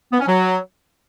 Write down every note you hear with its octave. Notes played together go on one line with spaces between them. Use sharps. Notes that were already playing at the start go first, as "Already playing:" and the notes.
B3
C#4
F#3